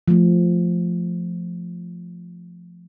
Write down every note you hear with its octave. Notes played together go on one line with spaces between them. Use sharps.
F3 A3